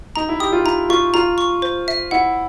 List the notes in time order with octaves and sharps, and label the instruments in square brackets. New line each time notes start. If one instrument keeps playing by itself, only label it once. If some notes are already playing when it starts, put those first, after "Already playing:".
[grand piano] D#4 [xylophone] A#5
[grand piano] E4
[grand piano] G4 [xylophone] D#6
[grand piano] F4
[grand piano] E4 [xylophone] A#5
[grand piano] F4 [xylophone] C#6
[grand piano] F4 [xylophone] A#5
[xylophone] C#6
C5
E5
[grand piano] E4 [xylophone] F#5